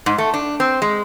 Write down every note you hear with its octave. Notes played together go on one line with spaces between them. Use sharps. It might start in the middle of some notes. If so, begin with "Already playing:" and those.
G#2
A3
D4
C4
G#3